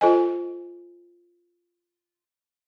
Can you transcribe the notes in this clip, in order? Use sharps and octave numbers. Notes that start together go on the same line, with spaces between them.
F4 A4 C5 D#5 G#5